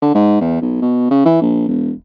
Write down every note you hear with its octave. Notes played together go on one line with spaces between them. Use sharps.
D3
G#2
E2
B1
B2
C#3
E3
A#1
E1